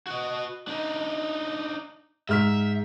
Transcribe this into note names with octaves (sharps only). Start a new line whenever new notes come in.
F#4 D#5
D4 D#4
G#2 E5 F6 B6